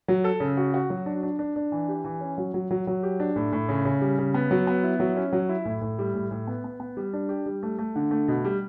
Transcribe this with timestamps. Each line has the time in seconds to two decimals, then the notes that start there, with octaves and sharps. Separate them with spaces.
0.08 F#3
0.24 A4
0.40 C#3
0.57 F#4
0.74 F#4
0.90 F#3
1.06 D4
1.23 D4
1.39 D4
1.56 D4
1.72 E3
1.88 G4
2.04 E3
2.21 C#4
2.38 F#3
2.54 F#3
2.71 F#3
2.87 F#3
3.03 G4
3.20 D4
3.36 A2
3.52 A2
3.69 C#3
3.85 C#3
4.02 G3
4.18 C#3
4.34 B3
4.51 F#3
4.67 B3
4.83 E4
5.00 F#3
5.17 C#4
5.32 F#3
5.49 E4
5.65 A2
5.81 A2
5.99 G3
6.14 A2
6.31 A2
6.47 B3
6.64 B3
6.80 B3
6.97 G3
7.13 D4
7.29 G4
7.46 G3
7.63 A3
7.79 A3
7.96 D3
8.11 A3
8.28 B2
8.45 G3